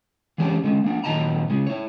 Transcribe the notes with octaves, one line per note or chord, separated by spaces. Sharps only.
E3 G#3 C#4 D4 G4
D3 G#3 C#4
A#3 D4 F#5
A#2 D#3 F#3 D#5 A5 A#5
C#3 G#3 C#4
E4 C#5